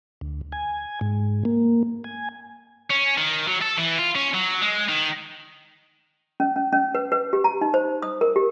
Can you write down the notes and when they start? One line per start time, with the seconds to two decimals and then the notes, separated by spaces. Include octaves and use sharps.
0.21 D2
0.52 G#5
1.01 G#2
1.45 A#3
2.04 G#5
2.90 C#4
3.18 D#3
3.48 F#3
3.62 A4
3.78 E3
3.98 F4
4.15 C#4
4.34 F#3
4.61 G#3
4.89 D#3
6.40 C#4
6.56 C#4
6.73 C#4
6.95 B4
7.12 B4
7.33 G4
7.44 A#5
7.61 D#4
7.74 C5
8.02 D#6
8.21 A#4
8.36 G4